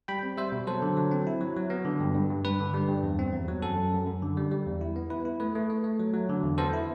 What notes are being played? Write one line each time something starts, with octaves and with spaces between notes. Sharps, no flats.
G3 G5 B5
C4
G3 C5 E5
B2
F#3 A4 C5
D3
F#3
C4
E4
F#3
F#3
B3
D3
G2
G2
G2
G2 B4
D3
G3
G2
E2
C4
E2
F#3
F#2 A4
F#2
F#2
F#2
D3
G3
G3
E2
E4
B3
E4 B4
E4
A3 B4
A3
A3
A3
F#3
F#3
D3
E2
B3 A4 C5
E4